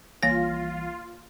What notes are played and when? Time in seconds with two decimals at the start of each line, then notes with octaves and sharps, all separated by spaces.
0.23 B1 E3 G3 A#3 F4 C#5 F5 A#6